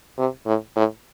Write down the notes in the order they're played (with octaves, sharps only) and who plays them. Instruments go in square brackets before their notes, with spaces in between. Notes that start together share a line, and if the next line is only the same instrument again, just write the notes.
[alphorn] C3
A2
A2